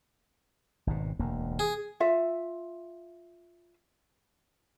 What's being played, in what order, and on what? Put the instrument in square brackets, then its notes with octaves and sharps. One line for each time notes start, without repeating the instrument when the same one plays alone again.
[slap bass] G#1 G#2 B2
E1 D2 A#3
[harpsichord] G#4
[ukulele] F4 E5